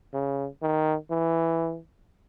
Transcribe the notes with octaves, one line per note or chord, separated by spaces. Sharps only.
C#3
D#3
E3